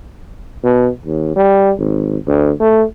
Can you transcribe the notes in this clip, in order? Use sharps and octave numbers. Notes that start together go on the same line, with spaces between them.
B2
D#2
G3
G#1
D2
A3